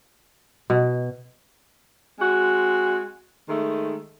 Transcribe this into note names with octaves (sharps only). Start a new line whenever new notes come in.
B2
G#3 C4 F#4
D#3 G#3 A3